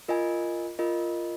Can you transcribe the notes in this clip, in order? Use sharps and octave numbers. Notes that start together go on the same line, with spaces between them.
F4 A#4 D#5 G#5
F4 A#4 D#5